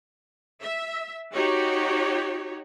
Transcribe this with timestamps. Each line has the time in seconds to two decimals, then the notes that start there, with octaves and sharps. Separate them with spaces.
0.61 E5
1.33 D#4 F#4 G4 C#5